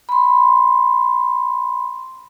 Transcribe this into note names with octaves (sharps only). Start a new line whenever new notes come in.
B5 C6